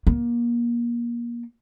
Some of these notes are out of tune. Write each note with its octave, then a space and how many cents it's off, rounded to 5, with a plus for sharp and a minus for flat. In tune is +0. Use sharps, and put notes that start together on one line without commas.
A#3 +30